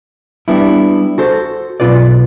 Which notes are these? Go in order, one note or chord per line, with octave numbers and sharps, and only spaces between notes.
G3 B3 D4 E4
F#4 A4 C5
B1 B2 E3 F4 B4 D5